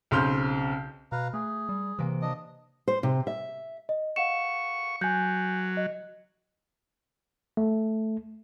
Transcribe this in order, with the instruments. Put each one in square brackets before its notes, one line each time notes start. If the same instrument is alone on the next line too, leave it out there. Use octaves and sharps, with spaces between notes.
[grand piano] B1 C#3 C4 C6 F6 G6
[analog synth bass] B2 [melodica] B4 F5 A#5
[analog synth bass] A3 [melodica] G#4
[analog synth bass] G3
[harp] C3 A#3 D7 [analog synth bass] E3
[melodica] D4 D#5
[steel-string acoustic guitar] C5
C3
E5
[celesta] D#5
[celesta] F5 F#5 E7 [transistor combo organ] C#6
[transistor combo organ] F#3 [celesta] G#5 G6
[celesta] D#5
[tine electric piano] A3